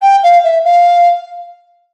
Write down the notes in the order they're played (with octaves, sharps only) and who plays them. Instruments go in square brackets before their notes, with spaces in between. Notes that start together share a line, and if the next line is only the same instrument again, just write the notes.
[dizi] G5
F5
E5
F5